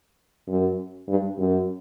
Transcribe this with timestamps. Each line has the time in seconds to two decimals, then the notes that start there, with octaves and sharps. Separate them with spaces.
0.48 F#2
1.08 G2
1.38 F#2